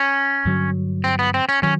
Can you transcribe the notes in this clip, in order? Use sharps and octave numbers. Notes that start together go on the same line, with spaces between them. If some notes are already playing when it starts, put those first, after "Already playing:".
Already playing: C#4
G2 D3 F#3
C4
B3
C4
C#4
D#3 F#3 C#4